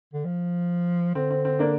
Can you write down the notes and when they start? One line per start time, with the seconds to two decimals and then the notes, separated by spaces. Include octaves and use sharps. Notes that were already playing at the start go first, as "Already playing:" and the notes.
0.13 D3
0.25 F3
1.15 D3 C4
1.30 C4
1.45 C4
1.59 A#3 D4